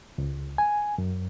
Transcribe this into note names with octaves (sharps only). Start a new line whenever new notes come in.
C#2
G#5
F#2